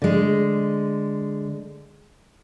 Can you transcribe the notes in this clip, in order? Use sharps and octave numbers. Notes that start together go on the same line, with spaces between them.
D3 G#3